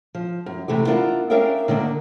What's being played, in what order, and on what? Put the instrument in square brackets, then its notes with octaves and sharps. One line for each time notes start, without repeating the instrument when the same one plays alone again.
[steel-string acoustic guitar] F3
F#2
C3 E3 A3 G4
B3 D4 E4 F4 A#4
C#4 D4 A#4 E5 F5 G5
D3 D#3 A#3 D4